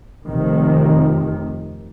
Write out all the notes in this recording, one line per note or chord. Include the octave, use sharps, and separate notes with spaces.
F1 C3 D#3